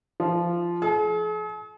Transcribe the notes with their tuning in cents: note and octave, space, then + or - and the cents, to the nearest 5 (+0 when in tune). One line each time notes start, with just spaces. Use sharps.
F3 -15
G#4 +45